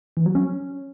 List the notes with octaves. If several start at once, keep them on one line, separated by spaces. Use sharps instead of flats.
E3
F#3
C#4